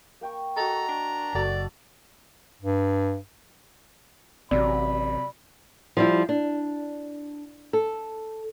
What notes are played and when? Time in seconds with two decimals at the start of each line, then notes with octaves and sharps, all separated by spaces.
0.21 A#3 G5 C#6
0.56 F#4 A4 D#5 A#5
0.88 D4
1.35 F#1 F#4 A4 D5
2.62 G2
4.51 A1 C3 F#3 D5 B5
5.97 F3 G3 E4
6.29 D4
7.73 A4